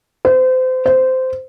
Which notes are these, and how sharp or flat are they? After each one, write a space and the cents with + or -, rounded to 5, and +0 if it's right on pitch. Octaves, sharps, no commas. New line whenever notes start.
C5 -30
C5 -15